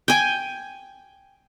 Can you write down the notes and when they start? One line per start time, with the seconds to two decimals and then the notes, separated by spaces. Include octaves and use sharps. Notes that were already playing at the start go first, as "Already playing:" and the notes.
0.08 G5 G#5